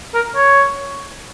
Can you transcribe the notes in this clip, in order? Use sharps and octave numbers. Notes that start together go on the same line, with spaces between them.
A#4
C#5